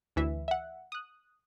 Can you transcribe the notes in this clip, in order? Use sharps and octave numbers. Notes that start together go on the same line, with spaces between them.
D2 E3 E5
E5 F#5
D#6 F#6